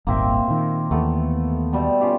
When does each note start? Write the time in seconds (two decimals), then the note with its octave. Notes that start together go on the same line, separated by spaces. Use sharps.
0.07 D#1 G#1 A#3 C4 E5
0.48 A#2 D#3
0.91 D#2 E3 A3 B3
1.73 B2 G3 A3
2.01 C#4 F4 G4